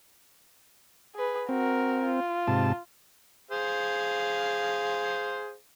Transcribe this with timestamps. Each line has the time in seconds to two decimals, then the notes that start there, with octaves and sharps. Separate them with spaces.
1.16 G#4 B4
1.49 C4 F#4 A#4
2.05 F4
2.48 G#2 C3 A5
3.51 G#4 C5 F5